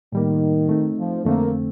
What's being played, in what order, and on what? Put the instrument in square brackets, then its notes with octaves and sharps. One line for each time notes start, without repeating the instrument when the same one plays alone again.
[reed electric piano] A2 G3 A#3 [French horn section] D#3
[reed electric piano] A3 C4 D#4
[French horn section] F3
[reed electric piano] F2 D3 A3 C4 [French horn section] A#3